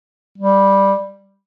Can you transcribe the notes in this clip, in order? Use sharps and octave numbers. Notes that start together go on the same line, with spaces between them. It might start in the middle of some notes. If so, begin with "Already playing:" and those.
G3